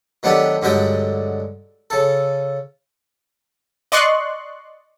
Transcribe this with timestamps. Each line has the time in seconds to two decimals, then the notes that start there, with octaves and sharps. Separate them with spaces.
0.23 D#3 F#3 A3 B3 D4 G4
0.62 G2 D3 F#3 G#3 D#5 G5
1.90 C#3 A4
3.92 D5 D#5 C6 C#6 F#6